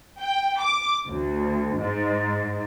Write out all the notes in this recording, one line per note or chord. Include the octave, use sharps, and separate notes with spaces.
G5
D6
D2
G#2